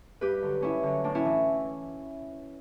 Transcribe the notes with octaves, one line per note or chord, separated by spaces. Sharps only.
G2 G4 B4
D3 F#3
G2 C#4 E4
D3 F#3
A2 D4
C#4 E4
E3